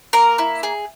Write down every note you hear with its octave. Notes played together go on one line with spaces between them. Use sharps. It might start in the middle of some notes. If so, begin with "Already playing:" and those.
A#3 A#4 A#5
E4
G#4